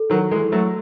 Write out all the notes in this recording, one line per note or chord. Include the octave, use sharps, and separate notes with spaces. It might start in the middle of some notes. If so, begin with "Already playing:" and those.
Already playing: A4
D#3 F#3
E3 G#3 A4
F#3 A3